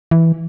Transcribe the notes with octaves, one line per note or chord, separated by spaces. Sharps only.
E3